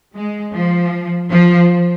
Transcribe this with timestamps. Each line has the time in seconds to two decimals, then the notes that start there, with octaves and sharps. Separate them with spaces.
0.15 G#3
0.54 F3
1.30 F3